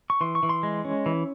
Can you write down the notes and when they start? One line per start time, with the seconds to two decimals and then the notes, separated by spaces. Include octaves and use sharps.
0.10 C#6
0.21 E3 C6
0.35 C#6
0.43 E3
0.49 C6
0.63 G#3
0.85 C#4
1.06 E3